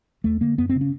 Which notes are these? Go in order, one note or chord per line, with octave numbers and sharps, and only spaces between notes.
D#2 A3
D3 A#3
F#2 B3
C4
C#3
C#4